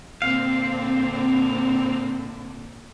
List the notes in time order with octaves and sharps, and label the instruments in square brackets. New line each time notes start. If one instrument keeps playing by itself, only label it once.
[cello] A#2 D3 [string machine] C4 [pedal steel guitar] F5